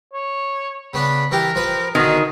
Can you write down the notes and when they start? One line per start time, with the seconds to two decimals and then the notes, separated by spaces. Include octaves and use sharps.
0.13 C#5
0.94 C#3 B3 D4 B5
1.31 E3 D4 G4 A#4
1.55 F3 B4
1.95 B2 D3 D#3 G#4